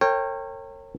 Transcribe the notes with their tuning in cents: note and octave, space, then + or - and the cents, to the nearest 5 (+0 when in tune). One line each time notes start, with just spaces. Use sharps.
A#4 -40 C#5 -30 G5 +5